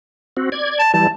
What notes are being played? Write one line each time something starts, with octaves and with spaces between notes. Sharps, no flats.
C4 F#4
D5 G#6
A5
E3 G3 A5